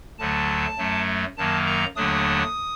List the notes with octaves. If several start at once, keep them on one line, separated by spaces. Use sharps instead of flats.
D2 D3 F#3 A3 A5
F#2 F#3 A3
F#2 D#3 F#3 A#3 A5
A#5
D#2 D3 F#3 A3 D4 D#6